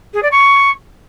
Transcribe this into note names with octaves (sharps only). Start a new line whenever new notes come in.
G#4
D5
C#6